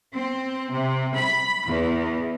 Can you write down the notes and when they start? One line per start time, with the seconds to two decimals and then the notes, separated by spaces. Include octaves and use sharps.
0.14 C4
0.72 C3
1.17 B5
1.67 E2